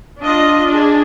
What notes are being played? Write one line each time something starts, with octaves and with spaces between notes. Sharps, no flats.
D4 F4 D#5
D4 G#4